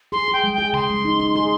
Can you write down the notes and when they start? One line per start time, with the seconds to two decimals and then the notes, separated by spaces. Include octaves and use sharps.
0.12 G#4 C6
0.28 G#4
0.33 G5
0.44 G#3
0.54 G#4 G5
0.73 C#3 C6
0.90 G#3
1.05 D#4
1.20 D#4
1.35 G#4